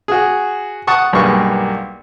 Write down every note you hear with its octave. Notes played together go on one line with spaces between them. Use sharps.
F#4 G#4
F#5 A5 C#6 D#6
B1 G2 A#3 G#4 A#4 C#6